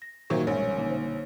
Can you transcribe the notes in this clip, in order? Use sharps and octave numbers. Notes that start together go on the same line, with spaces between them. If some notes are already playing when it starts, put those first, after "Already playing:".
A#6
A#2 D#3 F#3 A#4 C5 E5
A#1 B2 G3 G#3 C#4
D3 A#3 D#4
C5